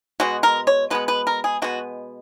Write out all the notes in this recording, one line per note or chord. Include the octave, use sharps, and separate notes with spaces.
B2 G#3 B3 F#4
A#4
C#5
B2 G#3 B3 B4
B4
A#4
G#4
B2 G#3 B3 F#4